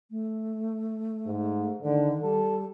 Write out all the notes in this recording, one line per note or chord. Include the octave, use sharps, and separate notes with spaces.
A3
G#2
D3 D#3
G3 A4